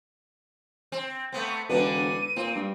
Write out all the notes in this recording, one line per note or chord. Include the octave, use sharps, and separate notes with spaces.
C4
A3 B3 C4
E1 D3 D4 B4 D#7
A#2 C4
G2